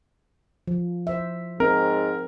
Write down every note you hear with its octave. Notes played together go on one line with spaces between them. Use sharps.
F3
C5 E5
G#2 C4 A#4